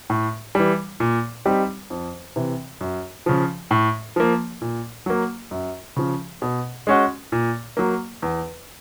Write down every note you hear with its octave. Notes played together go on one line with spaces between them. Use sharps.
A2
E3 G3
A#2
G3 C4 D#4 G4
F2
C3 E3
F#2
C#3 F3
A2
F3 A#3
A#2
F#3 A#3
F#2
C#3 F3
B2
G#3 C#4 F#4
A#2
F#3 A#3
E2